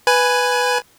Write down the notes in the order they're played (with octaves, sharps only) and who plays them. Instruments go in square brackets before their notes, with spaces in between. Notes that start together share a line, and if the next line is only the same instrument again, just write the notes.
[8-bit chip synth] B4 G#5